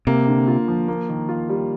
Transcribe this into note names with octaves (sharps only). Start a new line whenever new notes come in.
C3 A#3
D3
F4
F3
A#3
D#3
F4
G3